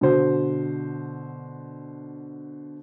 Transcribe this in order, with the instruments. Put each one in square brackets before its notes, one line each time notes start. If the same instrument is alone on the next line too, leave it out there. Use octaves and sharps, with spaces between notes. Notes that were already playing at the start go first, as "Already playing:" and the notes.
[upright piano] B2 D3 C5